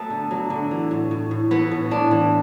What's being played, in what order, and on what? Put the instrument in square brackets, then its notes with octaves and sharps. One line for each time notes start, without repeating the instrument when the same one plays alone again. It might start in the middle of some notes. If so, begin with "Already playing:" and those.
Already playing: [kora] F#3 A3 B3
D3
F#3
D3
E3
A2
A2
A2
E3 B3
A2
A2 D4
E3